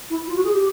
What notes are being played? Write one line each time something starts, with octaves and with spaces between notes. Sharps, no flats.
E4
F4
F#4
G#4
G4